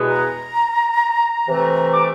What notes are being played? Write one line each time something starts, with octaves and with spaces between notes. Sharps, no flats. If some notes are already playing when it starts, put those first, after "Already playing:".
Already playing: E2 B2 G#3 B3
A#5
C3 E3 A3
D6